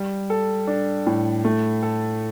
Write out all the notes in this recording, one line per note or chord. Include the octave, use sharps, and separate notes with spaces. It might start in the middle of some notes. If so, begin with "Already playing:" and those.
Already playing: G3
A4
D4
A2
A3
A4